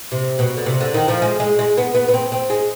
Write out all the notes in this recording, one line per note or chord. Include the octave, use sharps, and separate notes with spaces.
C3
B2
D3
C3
D3
D#3
F3
G#3
G#3
G#3
B3
B3
B3
C4
C4
G#3